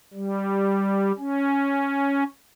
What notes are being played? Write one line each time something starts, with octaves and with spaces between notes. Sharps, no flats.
G3
C#4